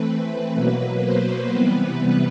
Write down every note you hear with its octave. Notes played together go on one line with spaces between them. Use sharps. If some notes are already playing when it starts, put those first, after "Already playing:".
Already playing: E3 A3 C4 B4
B2 F#3 A#3 B4
C5
C3 E3 G3 B3 B4